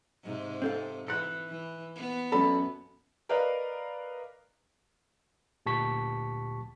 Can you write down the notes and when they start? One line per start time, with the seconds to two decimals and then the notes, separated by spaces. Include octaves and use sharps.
0.24 G#2 C3
0.62 C4 A4 F5
1.08 E3 F#6 C#7
1.48 E3
1.95 B3
2.32 F#2 A4 D5 B5
3.29 A#4 B4 D5 D#5 F5
5.66 D2 A#2 G4 A5 C#6 B6